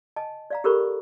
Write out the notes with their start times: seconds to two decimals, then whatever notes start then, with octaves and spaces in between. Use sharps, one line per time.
0.16 D#5 G#5 A5
0.50 D5 F5 A#5
0.64 G4 A4 A#4 C5 B5 C#6